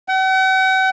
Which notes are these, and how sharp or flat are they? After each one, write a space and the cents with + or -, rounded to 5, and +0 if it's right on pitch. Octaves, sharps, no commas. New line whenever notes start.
F#5 +45